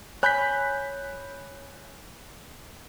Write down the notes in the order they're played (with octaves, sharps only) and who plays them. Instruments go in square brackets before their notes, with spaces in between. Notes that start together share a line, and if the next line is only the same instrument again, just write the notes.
[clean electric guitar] C#5 G#5 B5 [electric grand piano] F#6 G6 B6